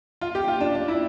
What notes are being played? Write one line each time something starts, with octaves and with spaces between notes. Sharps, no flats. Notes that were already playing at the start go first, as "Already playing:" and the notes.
F4
G4
F4
D4
D4
E4